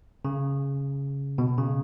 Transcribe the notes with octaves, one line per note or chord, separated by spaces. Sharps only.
C#3
B2
C#3